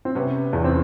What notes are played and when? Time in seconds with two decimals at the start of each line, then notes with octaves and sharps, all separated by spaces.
0.05 C4
0.15 C3 B3 C#4
0.53 E2 C#4
0.64 C4